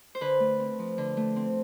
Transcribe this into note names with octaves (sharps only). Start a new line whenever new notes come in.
C5
D3 B4
A3
C4
F3
D3
A3
C4